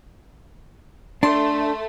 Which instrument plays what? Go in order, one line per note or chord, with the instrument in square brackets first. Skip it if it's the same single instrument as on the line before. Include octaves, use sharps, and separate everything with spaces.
[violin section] A3 [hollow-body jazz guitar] D4 [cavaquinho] C6